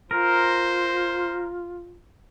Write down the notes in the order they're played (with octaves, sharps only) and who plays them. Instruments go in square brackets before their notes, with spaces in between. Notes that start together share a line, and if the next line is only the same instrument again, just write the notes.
[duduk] F4 [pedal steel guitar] A#4 [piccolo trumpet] C5